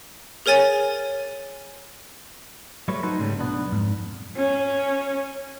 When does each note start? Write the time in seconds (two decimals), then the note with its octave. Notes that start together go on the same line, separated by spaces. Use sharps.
0.46 G#4 A#4 C#5 G#5 A6
2.88 F#3 G3 A3 B4 C#5
3.03 D#4 F#4 A4 B4 C5
3.19 G#2 C#3 F#3 G3 A3
3.39 B1 B3 D4
3.71 F2 G#2
4.36 C#4